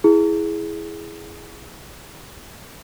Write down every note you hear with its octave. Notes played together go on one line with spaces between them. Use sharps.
E4 G#4